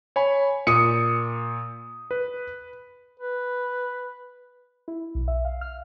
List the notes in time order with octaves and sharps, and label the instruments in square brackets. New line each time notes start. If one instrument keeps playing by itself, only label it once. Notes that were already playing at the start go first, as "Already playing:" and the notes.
[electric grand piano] C#5 G#5 B5
[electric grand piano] A#2 [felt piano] D#6 C#7
[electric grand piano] B4
[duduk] B4
[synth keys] E4
B1
E5
F5
F6